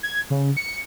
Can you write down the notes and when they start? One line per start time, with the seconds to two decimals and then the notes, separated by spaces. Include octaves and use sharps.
0.03 G#6
0.30 C#3
0.57 C#7